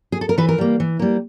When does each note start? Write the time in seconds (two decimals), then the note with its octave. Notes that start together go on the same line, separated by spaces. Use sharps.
0.12 G#4
0.21 A4
0.29 A#4
0.38 E3 B4
0.49 A#4
0.58 G3 A#3
0.80 E3
0.99 G3 A#3